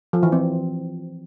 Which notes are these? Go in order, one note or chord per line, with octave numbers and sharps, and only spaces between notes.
F3
E3
C4